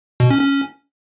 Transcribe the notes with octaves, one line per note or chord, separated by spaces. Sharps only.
B2
C#4
C#4